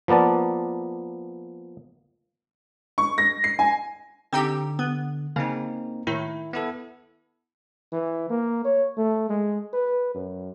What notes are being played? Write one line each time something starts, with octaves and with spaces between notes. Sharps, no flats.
F3 A#3 B3 D5 A5
C#6
A#6
C7
G#5
D3 C4 D#4 G4
B3
C#3 A#3 C4 D#4
A2 D#3 E4
B3 E4 A4
E3
A#3
C#5
A3
G#3
B4
F#2